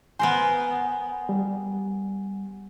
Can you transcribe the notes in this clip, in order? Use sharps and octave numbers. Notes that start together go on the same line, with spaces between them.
B3 A#4 C5 G#5
G3